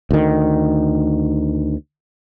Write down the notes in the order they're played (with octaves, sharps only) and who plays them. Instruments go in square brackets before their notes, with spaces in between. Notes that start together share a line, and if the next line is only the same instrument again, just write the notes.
[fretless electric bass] D2 D#3